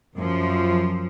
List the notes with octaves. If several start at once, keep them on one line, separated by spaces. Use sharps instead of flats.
F#2 F3